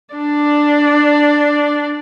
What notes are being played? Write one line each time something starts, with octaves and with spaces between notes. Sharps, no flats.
D4 D5